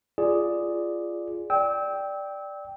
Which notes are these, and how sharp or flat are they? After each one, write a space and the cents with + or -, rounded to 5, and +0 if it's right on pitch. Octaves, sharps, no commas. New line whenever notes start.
F4 -15 G#4 +0 D5 +0
D5 +0 G5 +0 E6 -30